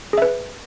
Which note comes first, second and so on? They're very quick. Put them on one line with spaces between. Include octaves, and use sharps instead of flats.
G#4 E5 B4